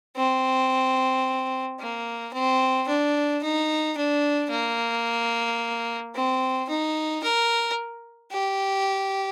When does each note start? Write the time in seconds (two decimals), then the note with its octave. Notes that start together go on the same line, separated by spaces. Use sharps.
0.17 C4
1.80 A#3
2.33 C4
2.88 D4
3.43 D#4
3.97 D4
4.51 A#3
6.15 C4
6.69 D#4
7.23 A#4
8.32 G4